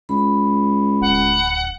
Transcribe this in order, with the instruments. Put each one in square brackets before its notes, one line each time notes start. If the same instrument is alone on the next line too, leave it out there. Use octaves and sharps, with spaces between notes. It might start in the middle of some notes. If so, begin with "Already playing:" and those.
[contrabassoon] C#2 [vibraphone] B5
[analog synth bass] D1 [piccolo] F#5